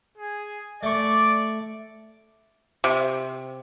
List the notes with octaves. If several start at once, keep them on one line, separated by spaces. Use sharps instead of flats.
G#4
A3 D5 C#6
C3